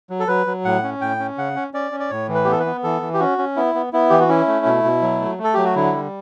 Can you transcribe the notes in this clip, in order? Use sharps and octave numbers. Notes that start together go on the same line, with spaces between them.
F#3
A4
F#3 B4
F#3
A2 F#5
C#4
A2 G5
C#4
C#3 F#5
C#4
C#4 D5
C#4
D5
A2 C#5
E3
B4
B3 G4
A4
B4
B3
E3 A4
E3
G4
C#4 F#4
C#4
B3 E4
B3
B3 E4
E3 G4
F#4
C#4 E4
A3
B2
B2
F#3
A3
A3
A4
F#3 G4
F#4
D3 E4
G3